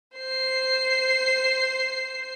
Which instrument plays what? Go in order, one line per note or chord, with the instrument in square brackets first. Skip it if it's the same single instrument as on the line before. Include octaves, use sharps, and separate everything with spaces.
[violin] C5 C7